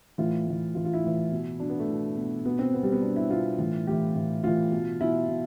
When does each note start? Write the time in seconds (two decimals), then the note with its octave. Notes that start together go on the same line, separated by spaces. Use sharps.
0.18 A2 E3 F4
0.47 A2 E3
0.75 A2 E3 F4
0.85 F4
0.93 E4
1.04 A2 E3
1.31 B2
1.60 B2 D4
1.70 B3
1.79 A3
1.89 B2
2.17 B2
2.45 B2 B3
2.59 C4
2.73 B2 B3
2.83 G3
2.92 B3
3.02 B2 D4
3.16 E4
3.30 B2 F4
3.59 A2 E3
3.87 A2 E3 G4
4.15 A2 E3
4.44 A2 E3 F4
4.72 B2
5.01 B2 E4
5.29 B2